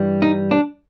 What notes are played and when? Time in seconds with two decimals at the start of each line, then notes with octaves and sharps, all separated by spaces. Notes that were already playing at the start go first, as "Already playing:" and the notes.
Already playing: G2 E3 G3
0.22 D#4
0.51 D4